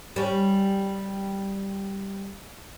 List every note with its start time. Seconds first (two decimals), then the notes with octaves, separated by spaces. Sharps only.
0.16 G3 C#4